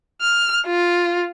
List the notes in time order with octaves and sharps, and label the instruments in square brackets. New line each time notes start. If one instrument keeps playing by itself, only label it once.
[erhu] F6
F4